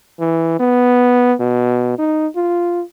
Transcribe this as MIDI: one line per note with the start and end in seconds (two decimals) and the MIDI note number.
0.19 0.55 52
0.60 1.33 59
1.40 1.97 47
1.98 2.27 63
2.36 2.82 65